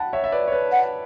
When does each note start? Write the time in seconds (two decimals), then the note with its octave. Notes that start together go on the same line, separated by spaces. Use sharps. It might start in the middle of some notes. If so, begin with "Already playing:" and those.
Already playing: F#5 G5 A5 B5
0.13 C#5 E5
0.24 E5
0.32 B4 D5
0.48 C#5
0.52 B4
0.72 F#5